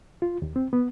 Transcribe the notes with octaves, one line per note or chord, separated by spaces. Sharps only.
F4
D#2
C4
B3